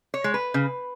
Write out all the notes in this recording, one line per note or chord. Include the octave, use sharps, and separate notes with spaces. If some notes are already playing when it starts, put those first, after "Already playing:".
C#5
G#3
B4
C#3